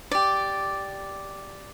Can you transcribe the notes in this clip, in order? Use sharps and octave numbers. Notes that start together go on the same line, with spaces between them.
G4 D5